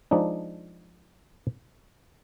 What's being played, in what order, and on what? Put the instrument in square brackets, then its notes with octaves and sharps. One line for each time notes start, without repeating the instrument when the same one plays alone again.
[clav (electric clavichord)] F3 G#3 D4 D#4